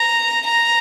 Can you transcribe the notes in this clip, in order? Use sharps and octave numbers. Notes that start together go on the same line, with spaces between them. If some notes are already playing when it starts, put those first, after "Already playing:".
Already playing: A#5
A#5